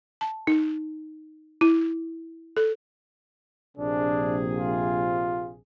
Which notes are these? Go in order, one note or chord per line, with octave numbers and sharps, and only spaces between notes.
A5
D#4
E4
A4
A#1 C3 D4 G#4
F4